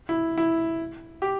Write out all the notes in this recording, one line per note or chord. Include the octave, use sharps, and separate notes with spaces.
E4
E4
G4